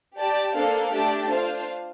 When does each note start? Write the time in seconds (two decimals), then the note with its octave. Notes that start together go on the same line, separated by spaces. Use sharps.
0.18 G4 D5 A5
0.55 A#3 D4 A4 C5 F5
0.92 A3 D4 G4 D5 A5
1.29 D4 F4 C5 F5